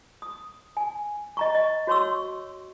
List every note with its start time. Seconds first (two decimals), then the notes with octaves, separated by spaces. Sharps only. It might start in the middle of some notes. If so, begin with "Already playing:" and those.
0.22 D#6
0.77 G#5
1.37 D#5 A#5 C#6
1.55 D#5
1.87 F#4 C#5 C6 C#6 E6